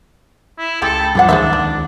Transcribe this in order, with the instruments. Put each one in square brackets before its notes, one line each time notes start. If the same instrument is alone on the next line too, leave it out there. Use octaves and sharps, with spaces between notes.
[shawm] E4
[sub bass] C#2 [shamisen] G#3 G4 [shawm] A4
[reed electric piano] G5 B5
[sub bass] C#2 [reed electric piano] G2 F3 [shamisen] G3 C4 F#5 [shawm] D4
[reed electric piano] D#2 D#3 A6 [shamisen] G#4 C5 E5
[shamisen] D5